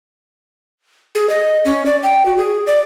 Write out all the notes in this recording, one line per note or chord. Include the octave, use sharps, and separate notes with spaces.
G#4
D#5
C#4
D5
G5
F#4
G#4
D5